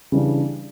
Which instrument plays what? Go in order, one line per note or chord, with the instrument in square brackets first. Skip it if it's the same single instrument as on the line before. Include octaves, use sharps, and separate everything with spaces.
[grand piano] C#3 E3 G3 D4